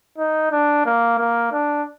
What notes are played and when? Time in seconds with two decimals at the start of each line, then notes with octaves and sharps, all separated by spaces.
0.18 D#4
0.52 D4
0.86 A#3
1.19 A#3
1.53 D4